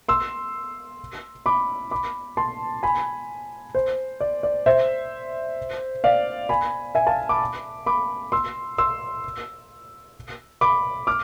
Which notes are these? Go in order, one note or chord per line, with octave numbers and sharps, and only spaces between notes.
C6 E6
B5 D6
B5 D6
A5 C6
G#5 B5
C5
D5
D5
C5 E5
D5 F5
G#5 B5
E5 G#5
F5 A5
B5 D6
B5 D6
C6 E6
C6 E6
B5 D6
D6 F6